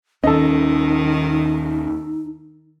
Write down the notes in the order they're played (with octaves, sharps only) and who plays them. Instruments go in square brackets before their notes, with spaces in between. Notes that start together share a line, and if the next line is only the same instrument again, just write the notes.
[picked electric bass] D#2 C#4 [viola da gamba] D#3 [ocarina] D#4 [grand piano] A4 D#5